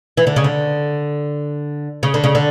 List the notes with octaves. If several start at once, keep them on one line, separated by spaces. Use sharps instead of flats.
E3
D3
C#3
D3
C#3
D3
C#3
D3